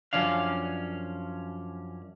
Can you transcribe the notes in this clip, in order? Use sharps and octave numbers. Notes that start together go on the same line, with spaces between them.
F#2 E3 F3 C#4 D4 F5